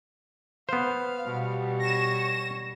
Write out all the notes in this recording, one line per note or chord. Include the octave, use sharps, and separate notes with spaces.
B3 C5 F5
B2 G3
C#5 C#6 A#6 E7